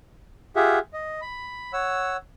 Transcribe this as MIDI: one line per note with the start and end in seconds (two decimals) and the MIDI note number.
0.56 0.79 65
0.56 0.79 67
0.56 0.79 68
0.56 0.79 76
0.56 0.79 78
0.93 1.21 75
1.21 1.72 83
1.73 2.17 73
1.73 2.17 78
1.73 2.17 88